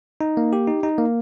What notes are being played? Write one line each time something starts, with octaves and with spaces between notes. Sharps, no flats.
D#4
A#3
G4
D#4
D#4
A#3